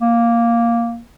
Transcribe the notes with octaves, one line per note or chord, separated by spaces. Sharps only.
A#3